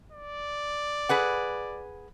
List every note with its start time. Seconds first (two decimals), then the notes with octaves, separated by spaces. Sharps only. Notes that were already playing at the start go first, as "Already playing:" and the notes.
0.12 D5
1.09 G#4 B4 F#5